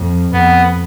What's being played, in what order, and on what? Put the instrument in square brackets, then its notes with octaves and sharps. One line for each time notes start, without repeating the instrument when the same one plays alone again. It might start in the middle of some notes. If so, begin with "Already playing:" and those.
Already playing: [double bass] F2
[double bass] F2 [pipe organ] B3